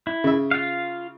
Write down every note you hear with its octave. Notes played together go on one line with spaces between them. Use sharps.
E4
C#3 E5
F4 F5